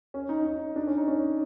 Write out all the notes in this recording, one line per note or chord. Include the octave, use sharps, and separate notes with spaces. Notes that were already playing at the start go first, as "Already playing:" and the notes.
C#4
D#4
D#4
D4
C#4
D#4
C#4